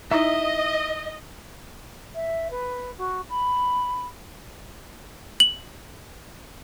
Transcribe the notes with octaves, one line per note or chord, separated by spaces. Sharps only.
D#4 E4 D#5 E5 A#5
E5
B4
F#4
B5
F#7